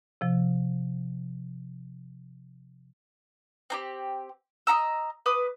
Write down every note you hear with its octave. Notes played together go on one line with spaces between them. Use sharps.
C3 F3
C4 D#4 G4
D#5 F#5 A#5 E6
B4 D6 D#6